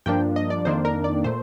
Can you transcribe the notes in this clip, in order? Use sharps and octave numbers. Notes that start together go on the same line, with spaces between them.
G2 F3 A#3 D4 G5
D#5
D5
F2 D#3 A#3 D4 C5
A#4
D5
A#2 A3 C5